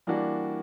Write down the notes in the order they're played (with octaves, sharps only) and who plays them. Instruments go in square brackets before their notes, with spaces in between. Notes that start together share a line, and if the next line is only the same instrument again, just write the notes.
[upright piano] E3 G3 A#3 D4 F#4